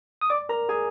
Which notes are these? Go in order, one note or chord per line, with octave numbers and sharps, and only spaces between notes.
D#6
D5 D6
A#4 A#5
G#4 G#5